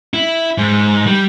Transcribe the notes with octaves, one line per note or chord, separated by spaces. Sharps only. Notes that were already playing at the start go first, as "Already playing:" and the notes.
E4
G#2
G3